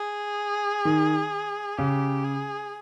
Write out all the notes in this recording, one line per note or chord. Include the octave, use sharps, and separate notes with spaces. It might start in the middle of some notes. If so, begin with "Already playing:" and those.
Already playing: G#4
D#3
C#3 G4
G#4